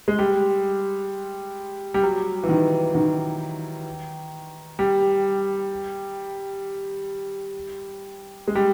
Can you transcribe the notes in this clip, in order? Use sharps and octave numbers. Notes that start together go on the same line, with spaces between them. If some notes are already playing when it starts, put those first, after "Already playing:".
G#3
G3
G3
F#3
E3
D#3
D#3
G3
G#3
G3